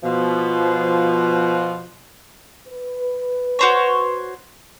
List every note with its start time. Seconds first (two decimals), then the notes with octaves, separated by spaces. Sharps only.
0.04 B2 F3
2.68 B4
3.59 F#4 C5 C#5